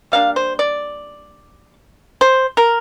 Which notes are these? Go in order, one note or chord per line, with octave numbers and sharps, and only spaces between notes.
G3 A#3 D4 F5
C5
D5
C5
A#4